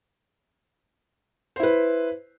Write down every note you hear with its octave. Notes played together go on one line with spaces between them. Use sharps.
E4 B4 C5